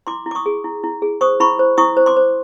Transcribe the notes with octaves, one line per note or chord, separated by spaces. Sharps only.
E4 C6 D6
E4
D6
C#6 D#6
G#4
E4
E4
G#4
C5 C#6 D#6
E4 B5 C#6
C5
E4 C#6 D#6
C5
C6 D6
C5